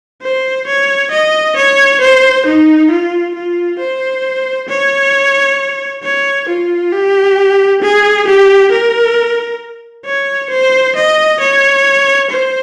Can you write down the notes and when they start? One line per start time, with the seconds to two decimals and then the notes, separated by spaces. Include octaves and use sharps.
0.22 C5
0.67 C#5
1.11 D#5
1.56 C#5
2.01 C5
2.46 D#4
2.90 F4
3.35 F4
3.79 C5
4.69 C#5
6.03 C#5
6.49 F4
6.92 G4
7.82 G#4
8.28 G4
8.72 A#4
10.05 C#5
10.50 C5
10.96 D#5
11.40 C#5
12.30 C5